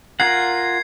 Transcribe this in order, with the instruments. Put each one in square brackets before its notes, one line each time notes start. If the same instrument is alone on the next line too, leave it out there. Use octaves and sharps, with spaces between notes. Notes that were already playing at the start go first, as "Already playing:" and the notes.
[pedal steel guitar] F4 A#4 F#5 [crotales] G#6 C7